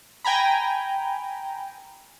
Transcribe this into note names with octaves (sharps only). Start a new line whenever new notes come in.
G5 G#5 A#5 B5